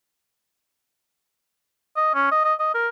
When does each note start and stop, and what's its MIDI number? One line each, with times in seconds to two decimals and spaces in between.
1.97 2.11 75
2.15 2.31 61
2.32 2.44 75
2.44 2.54 75
2.59 2.70 75
2.74 2.88 70